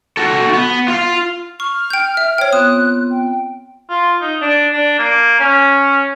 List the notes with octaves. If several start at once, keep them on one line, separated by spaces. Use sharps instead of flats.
F#4 A4
B3
F4 F5
C#6 F6
G5 G6
E5
C5 C#5 G5
B3 C4 F4 D#6 F#6
G5
F4
D#4
D4
D4
A#3
C#4